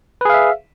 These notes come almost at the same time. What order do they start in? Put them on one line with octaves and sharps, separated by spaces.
B4 G#4 F5 E5